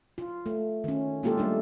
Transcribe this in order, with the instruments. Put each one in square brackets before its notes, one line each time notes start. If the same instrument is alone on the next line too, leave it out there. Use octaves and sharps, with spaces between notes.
[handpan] F4
A3
D#3 C#4
G#3 A#3 F4 G4 A4
G3 A3 D4